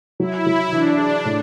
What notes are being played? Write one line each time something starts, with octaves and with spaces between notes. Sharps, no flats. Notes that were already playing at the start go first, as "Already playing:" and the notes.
F#3 E4
F#3
E3 D4
G#4
A2